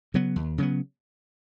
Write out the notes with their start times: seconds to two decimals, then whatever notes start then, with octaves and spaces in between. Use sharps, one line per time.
0.14 C#3 F#3 B3
0.36 D#2
0.58 C#3 F#3 B3